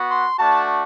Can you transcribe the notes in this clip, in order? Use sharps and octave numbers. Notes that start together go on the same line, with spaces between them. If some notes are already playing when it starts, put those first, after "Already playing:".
Already playing: B3 F#4
C6
A3 D4 F#4 A5